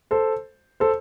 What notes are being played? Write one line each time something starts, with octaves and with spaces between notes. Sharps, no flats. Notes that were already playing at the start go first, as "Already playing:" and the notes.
A4 C5
A4 C5